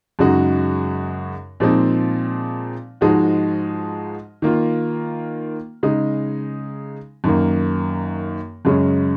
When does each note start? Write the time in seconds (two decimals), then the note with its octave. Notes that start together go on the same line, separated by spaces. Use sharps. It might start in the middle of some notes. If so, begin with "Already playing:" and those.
0.19 F#2 C#3 G#3 D#4 F#4
1.60 A#2 F3 G#3 C4 D#4
3.01 G#2 F3 G#3 D#4 F#4
4.42 D#3 A#3 F4
5.83 C#3 G#3 D#4
7.24 F#2 D#3 A#3
8.65 F#2 C#3 G#3 C#4